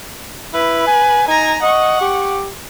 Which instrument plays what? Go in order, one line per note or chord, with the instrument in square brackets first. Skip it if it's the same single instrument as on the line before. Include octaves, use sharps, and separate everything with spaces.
[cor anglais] E4 [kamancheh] B4
[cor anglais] G#5
[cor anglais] D#4 [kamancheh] G#5 A#5
[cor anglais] D#5 [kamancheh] F#5 C#6
[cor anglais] G4